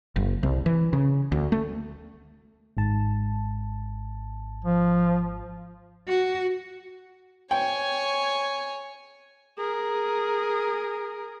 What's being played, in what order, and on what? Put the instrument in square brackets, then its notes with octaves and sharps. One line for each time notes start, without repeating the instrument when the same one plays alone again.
[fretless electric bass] F#1
C2
E3
C#3
D2
A3
[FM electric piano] G#1 G#2 A5
[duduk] F3
[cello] F#4
[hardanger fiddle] C#5 G#5 [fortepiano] G5
[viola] G#4 A#4